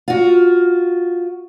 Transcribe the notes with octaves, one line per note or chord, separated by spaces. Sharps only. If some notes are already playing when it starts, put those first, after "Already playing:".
F4 F#4